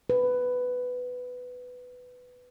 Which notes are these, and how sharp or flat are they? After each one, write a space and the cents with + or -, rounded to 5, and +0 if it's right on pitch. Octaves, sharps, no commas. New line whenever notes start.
B4 +10